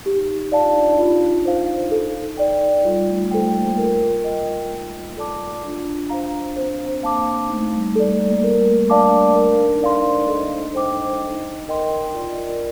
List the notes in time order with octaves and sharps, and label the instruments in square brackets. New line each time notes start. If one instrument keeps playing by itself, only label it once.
[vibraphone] D#4 [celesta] G4
[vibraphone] F4 [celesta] D5 F5 A5
[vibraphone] D4
D#4
[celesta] F4
C5 F5
A4
D5 G5
[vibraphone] G3 [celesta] F4
[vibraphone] A3
[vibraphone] A3 [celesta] A4 C5 G5
[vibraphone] A#3
[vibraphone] F4 [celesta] A#4
[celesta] D#5 G5
D#4
A4 D5 A5 D6
[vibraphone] D4 [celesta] F4
[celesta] C5 F5 A#5
[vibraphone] C4 [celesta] C5
[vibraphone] A#3 [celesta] F5 A5 D6
[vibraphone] A3 [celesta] D#4
[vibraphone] G3
G3
[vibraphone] A3 [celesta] A4 D5
[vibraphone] A#3
[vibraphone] A3 [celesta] A#4
[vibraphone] D4 [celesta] D5 F5 A5 D6
[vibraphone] D4 [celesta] A#4
[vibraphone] D#4
[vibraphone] A4 [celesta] D5 F5 C6
[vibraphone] C5
[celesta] A4 [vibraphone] D#5
[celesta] C5 G5 D6
D#4
A#4 D#5 G5 C6
[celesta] F4 [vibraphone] D5
[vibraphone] A#4